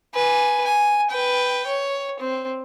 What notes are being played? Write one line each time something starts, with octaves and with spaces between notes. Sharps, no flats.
B4 G#5
G#5
B4 G5
C#5
C4